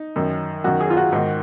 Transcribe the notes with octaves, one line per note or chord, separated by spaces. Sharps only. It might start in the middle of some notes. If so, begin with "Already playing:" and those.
Already playing: D#4
F#2 D#3
F#2 D#3 F#4
G#4
F4
F#4
G#2 D#3